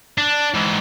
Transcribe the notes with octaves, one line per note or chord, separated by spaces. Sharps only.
D4
G#2 E3